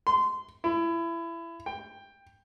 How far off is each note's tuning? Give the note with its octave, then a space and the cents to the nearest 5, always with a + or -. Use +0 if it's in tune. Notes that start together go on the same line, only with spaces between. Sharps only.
C6 -20
E4 +25
G5 +10